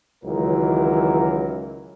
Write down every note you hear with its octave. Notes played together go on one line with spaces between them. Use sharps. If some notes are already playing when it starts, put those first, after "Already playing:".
C#2 D#3 E3 F#3 A#4